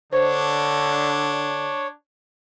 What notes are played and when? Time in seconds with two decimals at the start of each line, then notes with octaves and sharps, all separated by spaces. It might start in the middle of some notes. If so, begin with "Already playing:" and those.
0.13 D3 D4 C5 C#5